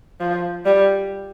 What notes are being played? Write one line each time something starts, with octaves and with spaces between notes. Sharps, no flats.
F3
G3